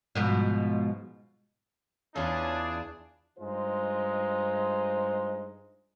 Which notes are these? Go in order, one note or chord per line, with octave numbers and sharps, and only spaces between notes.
G#2 B2 F3
E2 C#4 D4 F4 G#4
G2 G#3 D#4 F4 C5